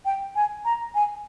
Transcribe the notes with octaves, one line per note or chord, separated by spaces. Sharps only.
G5
G#5
A#5
G#5